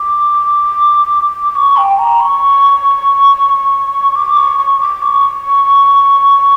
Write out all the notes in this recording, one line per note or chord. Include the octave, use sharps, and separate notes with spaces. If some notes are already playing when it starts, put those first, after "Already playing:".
Already playing: D6
C#6
G5
A#5
C#6
D6
C#6
C#6
D6
C#6